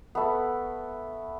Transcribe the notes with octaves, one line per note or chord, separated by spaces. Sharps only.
A3 B3